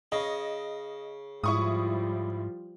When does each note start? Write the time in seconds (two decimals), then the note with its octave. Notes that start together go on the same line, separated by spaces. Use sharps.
0.12 C#3 D#5
1.44 G#2 F3 G3 E4 C#6 D#6